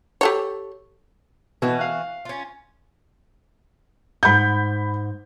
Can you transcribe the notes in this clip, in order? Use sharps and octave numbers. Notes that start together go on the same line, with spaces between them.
G4 A4 C#5
B2 E3 F#4
F5 F#6
C#4 F4
G#2 F#5 B5 G6